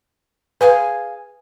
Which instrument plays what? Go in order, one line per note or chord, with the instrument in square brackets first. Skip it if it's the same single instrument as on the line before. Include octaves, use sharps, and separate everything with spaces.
[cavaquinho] G#4 F5 G#5 [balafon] B4